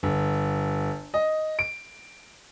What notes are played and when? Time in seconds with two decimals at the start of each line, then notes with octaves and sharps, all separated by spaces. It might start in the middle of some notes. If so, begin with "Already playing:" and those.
0.03 G1
1.14 D#5
1.59 D7